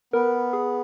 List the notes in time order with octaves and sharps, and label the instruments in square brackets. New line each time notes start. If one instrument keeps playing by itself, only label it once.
[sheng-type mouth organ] B3 [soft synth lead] A#4
[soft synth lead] G#4